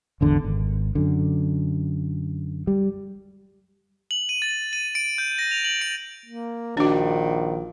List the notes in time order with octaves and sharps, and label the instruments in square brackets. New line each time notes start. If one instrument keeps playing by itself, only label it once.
[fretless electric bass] G#1 E2 D3
G#1
F#2 D3
G3
[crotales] F#7
D#7
A6
D#7
D7
G6
A#6
F7
F#7
D7
[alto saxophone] A#3
[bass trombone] A#1 [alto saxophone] D#3 [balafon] D4 F#4